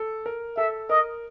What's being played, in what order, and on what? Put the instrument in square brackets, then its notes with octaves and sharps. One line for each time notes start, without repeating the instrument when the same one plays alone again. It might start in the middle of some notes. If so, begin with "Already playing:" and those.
Already playing: [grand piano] A4
A#4
[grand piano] A4 [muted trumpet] E5
[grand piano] A#4 [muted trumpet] D#5